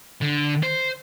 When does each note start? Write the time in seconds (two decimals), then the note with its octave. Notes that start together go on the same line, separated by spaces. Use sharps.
0.21 D3
0.63 C5